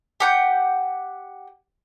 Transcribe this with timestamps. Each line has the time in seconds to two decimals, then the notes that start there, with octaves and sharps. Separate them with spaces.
0.20 G4 F#5 G6